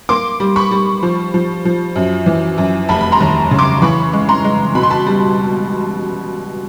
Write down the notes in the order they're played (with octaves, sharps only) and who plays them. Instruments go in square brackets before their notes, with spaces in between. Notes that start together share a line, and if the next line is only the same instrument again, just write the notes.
[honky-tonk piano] A#3 C6 D6
G3
B5 C#6
G3
F3
F3
F3
F#2
E3
F#2
F1 A5 B5
B5
A#5 C6
D#2
C#3
C6 D6
E3 B5 C#6
G#3
A#5 C6
G#3
B2 B5
C6
A5 B5
G3